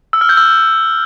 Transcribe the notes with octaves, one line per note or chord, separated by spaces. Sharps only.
E6
F6
G6
E6